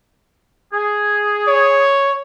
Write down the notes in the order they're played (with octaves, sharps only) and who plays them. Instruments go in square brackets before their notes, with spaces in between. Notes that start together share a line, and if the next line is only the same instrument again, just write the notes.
[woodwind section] G#4
[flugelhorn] C#5